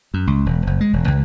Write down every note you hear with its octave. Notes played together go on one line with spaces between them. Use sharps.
F#2
C#2
E1
F#1
G#3
E1
C#2